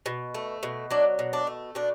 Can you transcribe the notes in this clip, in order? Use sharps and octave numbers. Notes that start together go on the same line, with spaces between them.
B2
A3
B2
F#3 D4
B2
D4
A3
B2 D4